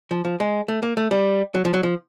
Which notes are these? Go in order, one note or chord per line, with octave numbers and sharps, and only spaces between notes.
F3
F3
G#3
A3
A#3
A3
G3
F#3
F3
F#3
F3